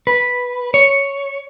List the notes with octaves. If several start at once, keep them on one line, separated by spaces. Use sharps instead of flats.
B4
C#5